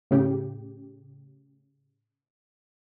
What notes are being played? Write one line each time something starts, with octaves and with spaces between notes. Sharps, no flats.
A2 C#3 G4